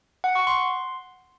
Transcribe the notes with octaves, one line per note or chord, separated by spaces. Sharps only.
F#5
C#6
C6